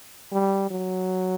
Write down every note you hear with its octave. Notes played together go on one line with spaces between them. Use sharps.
G3
F#3